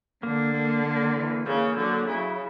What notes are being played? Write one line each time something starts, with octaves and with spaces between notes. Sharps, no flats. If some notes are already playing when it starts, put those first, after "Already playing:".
D3 A#3
A#3
A#3
E3
C#3 A#3
D3 F#3
C#3 E4